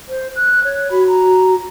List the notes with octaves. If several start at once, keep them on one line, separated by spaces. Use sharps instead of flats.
C5
F#6
C#5
F#4 B5
A#5